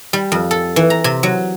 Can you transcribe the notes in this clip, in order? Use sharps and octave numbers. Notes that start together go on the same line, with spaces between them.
G3
F2
A4
E3
A#5
C3
F#3